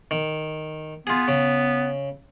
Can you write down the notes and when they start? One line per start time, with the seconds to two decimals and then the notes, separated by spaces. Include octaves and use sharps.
0.11 D#3
1.07 B3 F4 G#4
1.28 C#3